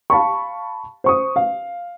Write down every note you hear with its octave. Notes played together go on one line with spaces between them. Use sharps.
F5 A5 B5 C#6
C5 C#6 D#6
F5